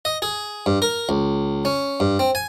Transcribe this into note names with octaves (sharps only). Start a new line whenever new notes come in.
D#5
G#4
G2
A#4
C#2
C#4
G2
C4
G#5